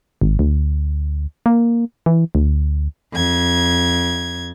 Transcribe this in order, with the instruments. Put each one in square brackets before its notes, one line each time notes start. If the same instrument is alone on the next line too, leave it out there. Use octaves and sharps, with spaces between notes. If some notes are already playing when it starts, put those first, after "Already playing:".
[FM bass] G#1
D2
A#3
E3
D2
[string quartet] F2 G#6